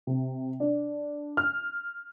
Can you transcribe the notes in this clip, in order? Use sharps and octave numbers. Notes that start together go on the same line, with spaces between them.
C3
D4
F6